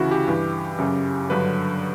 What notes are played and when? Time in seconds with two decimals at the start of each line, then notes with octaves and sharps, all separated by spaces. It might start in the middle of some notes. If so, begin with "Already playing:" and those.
Already playing: D2 C#3 E3 E4 F#4
0.11 G4
0.28 G2 E3
0.78 F#2 C#3 F#3
1.30 G2 D3 F#3 B4